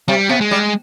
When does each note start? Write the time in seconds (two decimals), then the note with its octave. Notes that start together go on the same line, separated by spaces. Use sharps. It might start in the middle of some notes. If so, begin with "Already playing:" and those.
0.08 C3 G3
0.29 C3 B3
0.41 G#3
0.51 G3